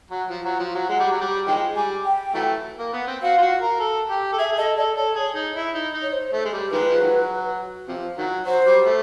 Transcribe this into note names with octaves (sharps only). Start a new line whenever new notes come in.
F#3
F3
F#3
F3
F#3
G#3 F#5
G3
F#3
G3
D#3 F3 G#3 G5
G3 G#5
G5
E3 F#3 A3
A#3
B3
C4
F#4 F5
F4
F#4
A#4
A4
G4
A4
G#4 E5
G#4
A4 D#5
A4 D5
A4 C#5
G#4
D#4
E4
D#4
D#4
C#5
C5
A3
G#3
G3
D#3 F3 G#3 B4
F3
D#3 F#3
C3 F3
D#3 F#3
F#3 C5
G3
A3